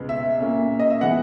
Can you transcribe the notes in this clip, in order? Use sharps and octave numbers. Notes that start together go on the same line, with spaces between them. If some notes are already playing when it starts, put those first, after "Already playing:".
Already playing: C#2 B2 G#3 B3
E5
A#2 A#3 C#4
D#5
E5
E3 G#3 B3 F#5